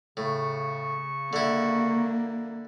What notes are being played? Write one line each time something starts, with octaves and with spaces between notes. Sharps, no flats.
A2 C#3 C#6
D3 A#3 E4